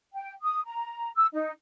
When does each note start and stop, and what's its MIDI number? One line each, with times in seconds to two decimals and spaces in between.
0.14 0.32 79
0.42 0.60 87
0.65 1.10 82
1.16 1.26 88
1.33 1.51 63